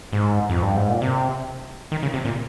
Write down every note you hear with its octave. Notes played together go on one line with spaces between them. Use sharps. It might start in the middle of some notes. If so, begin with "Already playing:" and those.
G#2
F2
G2
G#2
A#2
C3
D#3
C#3
C3
A#2